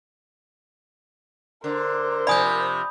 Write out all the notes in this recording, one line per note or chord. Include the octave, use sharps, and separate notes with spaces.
D3 A#4 C5
C3 F3 D5 G#5 B5 D#6 G6